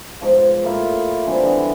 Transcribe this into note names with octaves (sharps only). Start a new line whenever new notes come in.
G#2 B2 F3 C#5
A2 A#3 E4 F4
D3 E3 G3 C4
D3 E3 G3 B3